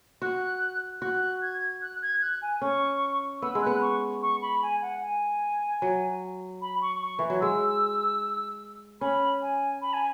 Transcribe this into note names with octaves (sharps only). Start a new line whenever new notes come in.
F#4 F#6
F#4 F#6
G#6
F#6
G#6
F#6
G#5
C#4 C#6
B3 E6
G#3 E6
B3 F#6
C#6
C#6
B5
G#5
F#5
G#5
F#3
B5
C#6
C#6
E3
F#3
G#3 E6
C#4 B5
G#5
B5
G#5